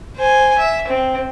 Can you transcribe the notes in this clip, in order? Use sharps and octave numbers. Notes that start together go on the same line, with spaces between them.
C5 G#5
E5
C4